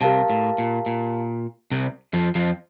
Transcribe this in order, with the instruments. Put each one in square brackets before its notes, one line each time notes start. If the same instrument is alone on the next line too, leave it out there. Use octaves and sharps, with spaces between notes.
[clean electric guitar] C2 C3 [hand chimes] G4 A#4 F5 A5
[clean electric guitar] A2
A#2
A#2
C2 C3
F2 F3
F2 F3